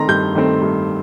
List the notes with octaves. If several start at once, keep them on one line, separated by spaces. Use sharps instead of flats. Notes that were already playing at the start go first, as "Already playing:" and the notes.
Already playing: D#3 A3 C4 A#5 C6
G2 G6
D#3 A3 C4
G2